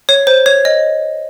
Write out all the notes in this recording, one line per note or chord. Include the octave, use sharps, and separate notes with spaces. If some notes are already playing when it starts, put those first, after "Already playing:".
C#5
C5
C#5
D#5